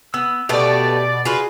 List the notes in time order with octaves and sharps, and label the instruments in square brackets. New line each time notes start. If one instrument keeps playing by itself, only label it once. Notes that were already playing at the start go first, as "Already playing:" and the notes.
[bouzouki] B3 [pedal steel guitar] E6
[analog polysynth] B2 D5 [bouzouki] A3 B3 [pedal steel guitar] G4
[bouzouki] F4 F#4 B4 [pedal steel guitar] G#4